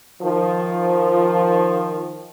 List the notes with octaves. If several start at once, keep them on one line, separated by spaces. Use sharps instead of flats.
D#3 F3